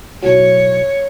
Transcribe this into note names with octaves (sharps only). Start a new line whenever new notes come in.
B1 A2 F#3 C#5